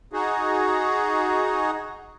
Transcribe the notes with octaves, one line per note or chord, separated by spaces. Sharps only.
D#4 F#4 G#4